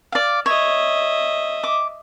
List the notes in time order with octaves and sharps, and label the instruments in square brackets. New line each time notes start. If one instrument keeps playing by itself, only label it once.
[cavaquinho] D5 F5
[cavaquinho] C#5 [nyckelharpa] D#5 E5
[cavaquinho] D6